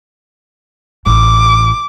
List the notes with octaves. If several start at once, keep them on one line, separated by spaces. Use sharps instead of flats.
A1 D6